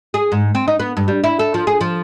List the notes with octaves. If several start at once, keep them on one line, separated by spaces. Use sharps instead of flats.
G#4
G#2
C4
D#4
B3
G2
G3
E4
A4
F3
G#4
F3